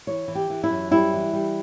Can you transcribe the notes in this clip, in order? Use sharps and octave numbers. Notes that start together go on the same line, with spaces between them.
E3 C#5
E3
G4
E3
E4
F#2
G3 E4
E3
G3